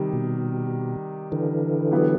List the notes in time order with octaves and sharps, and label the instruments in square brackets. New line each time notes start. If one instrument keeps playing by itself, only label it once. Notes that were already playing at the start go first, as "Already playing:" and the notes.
Already playing: [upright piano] C3 D#3 G3
[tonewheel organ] B2
D3 E3
[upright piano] F#3 B3 E4 G4 B4